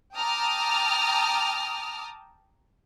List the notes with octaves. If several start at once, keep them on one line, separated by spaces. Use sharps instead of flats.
G5 A5 A#5 D6 D#6 F6